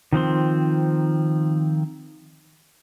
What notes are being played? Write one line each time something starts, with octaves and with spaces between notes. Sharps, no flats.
D#3 F3 C4 C6